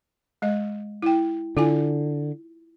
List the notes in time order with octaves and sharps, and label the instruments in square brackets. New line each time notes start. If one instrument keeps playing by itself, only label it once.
[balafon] G#3 D#5
E4 G5
[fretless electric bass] D3 [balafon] E4 F4 G#5